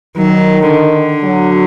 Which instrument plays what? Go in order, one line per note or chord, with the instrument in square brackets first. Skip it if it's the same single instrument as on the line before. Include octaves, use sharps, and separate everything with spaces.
[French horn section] D#3 [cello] F#3
[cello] D3
[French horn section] F#3